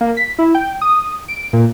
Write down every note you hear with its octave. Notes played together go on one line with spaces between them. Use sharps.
A#3
B6
E4
G5
D#6
D7
A#2